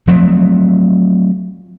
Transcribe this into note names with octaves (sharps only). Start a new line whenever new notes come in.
F3 F#3 A3 C4